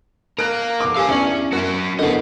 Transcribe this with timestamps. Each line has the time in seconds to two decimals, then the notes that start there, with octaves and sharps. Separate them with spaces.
0.39 A#4 F5 F#6 D7
0.80 F1 D6
0.97 G4 C5 F5 G#5
1.09 E2 C#4 D4 E5 F#7
1.52 F#2 C#4 F#4
1.99 E2 D3 A#4 D#5 F#5